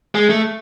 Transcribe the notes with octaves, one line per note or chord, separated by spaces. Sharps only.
G#3
A3